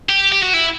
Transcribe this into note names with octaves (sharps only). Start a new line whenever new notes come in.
G4
G4
F#4
E4